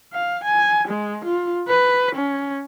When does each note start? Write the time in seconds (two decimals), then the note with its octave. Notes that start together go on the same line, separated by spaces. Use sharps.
0.14 F5
0.44 G#5
0.88 G#3
1.25 F4
1.69 B4
2.16 C#4